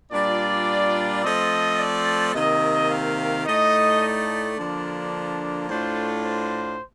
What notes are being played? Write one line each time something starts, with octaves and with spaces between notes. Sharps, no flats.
A#2 G3 D4 F4 D5
F3 A3 C4 D#5
D5
C3 D#3 A#3 D#5
F5
A2 A3 D#4 D#5
D5
D3 F3 A#3 D4
A2 A3 D4 F4 C5
C5